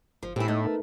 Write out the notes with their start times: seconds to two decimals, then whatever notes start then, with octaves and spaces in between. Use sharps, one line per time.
0.23 G1 F3
0.36 A2 C4 E4 G4 G#5
0.48 A3 D#4 D#5
0.64 D#4 A#4 B4